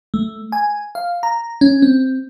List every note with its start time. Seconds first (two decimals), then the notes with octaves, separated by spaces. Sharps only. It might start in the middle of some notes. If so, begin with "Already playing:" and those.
0.14 A3
0.52 G#5
0.95 F5
1.23 A#5
1.61 C#4
1.82 C4